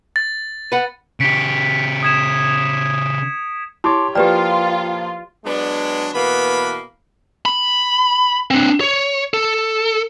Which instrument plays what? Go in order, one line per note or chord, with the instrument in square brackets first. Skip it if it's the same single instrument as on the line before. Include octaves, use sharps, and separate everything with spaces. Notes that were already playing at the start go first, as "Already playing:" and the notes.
[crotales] A6
[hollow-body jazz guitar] B4 F#5
[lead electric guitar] C#3 G4 [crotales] B6 C#7 D7
[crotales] D#6 G#6 E7
[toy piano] E4 [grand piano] G4 C#5 [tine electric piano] A5 C6 D6
[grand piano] F3 A#3 [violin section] F4 [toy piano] G4 B4 D5 [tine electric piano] G5 F6
[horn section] F#3 G#3 B3 D4
B2 E3 A#3 B3 B5
[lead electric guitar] B5
C4 D4
C#5
A4